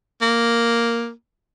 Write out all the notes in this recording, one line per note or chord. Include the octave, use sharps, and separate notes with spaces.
A#3